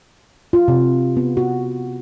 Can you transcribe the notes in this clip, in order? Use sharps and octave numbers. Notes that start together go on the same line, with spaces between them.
F4
C3
B3
F#4